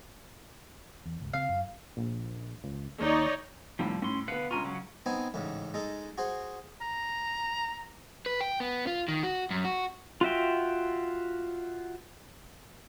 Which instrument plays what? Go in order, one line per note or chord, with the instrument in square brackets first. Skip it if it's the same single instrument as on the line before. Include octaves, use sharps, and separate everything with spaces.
[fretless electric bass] E2
G1 C#2
[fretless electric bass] C#3 C4 [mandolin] F5
[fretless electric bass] F#2
[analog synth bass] A#1
C#2
[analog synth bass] D#2 [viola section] D#4 C#5 D5
[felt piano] D#2 A2 C3 [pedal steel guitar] F3 G3
[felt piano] A2 [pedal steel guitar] C#4 C6
[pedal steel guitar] D3 B4 F5 [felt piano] B3 C#7
[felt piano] C#2 A#5 C#6 [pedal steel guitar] F4 G#5
[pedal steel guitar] C#3 F#3 C#4
[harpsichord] B3 C4 D#4 G#5
A1 G#2 C#3
G#3 D#4 A4
F#4 G#4 C5
[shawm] A#5
[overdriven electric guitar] B4
G5
B3
F4
D#3
F#4
F#2
F#4
[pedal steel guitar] F4 F#4 E5 G5